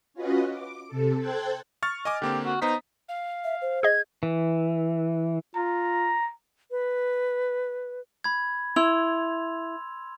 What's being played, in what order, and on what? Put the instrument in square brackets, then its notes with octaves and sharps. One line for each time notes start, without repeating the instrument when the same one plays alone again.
[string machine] C#4 F4 F#4 B4 D#5
D6
C3 A4
A4 C5 G5 A5 F#6 G#6
[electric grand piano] C#6 F6 A6
D#5 G#5 D6
[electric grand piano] D3 A#3 C4 [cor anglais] G4
[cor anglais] F#4
[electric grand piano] B3 C5 B6 [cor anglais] D#4
[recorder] F5
[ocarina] E5
C5
[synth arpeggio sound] G#4 D#5 [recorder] G#6
[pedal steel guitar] E3
[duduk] F4 [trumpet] A#5
[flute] B4
[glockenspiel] B5 G#6
[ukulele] E4 [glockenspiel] C6 E6 F7